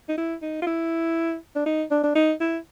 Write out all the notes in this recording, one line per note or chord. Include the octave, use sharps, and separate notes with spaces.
D#4
E4
D#4
F4
E4
D4
D#4
D4
D4
D#4
E4